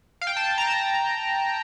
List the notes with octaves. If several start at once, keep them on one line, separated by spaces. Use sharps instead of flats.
F5
G5
A5
A#5
A5